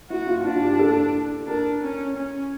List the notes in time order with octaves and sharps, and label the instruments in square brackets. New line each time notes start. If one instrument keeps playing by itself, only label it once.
[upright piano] E4 [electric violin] F#4
[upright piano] F4
[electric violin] D4 [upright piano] F4
[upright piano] G4
A4
[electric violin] D4 [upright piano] A#4
[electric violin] C#4
C#4